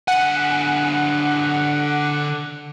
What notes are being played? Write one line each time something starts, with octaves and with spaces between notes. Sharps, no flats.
D3 F#5 G#5